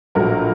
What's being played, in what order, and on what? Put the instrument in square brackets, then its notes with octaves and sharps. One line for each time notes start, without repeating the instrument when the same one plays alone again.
[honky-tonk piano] A#1 A2 F#3 A3 A#4